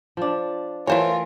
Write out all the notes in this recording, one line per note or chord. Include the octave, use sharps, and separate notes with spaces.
F3 D4
E3 A3 E4 F4 A#4 C5 C#5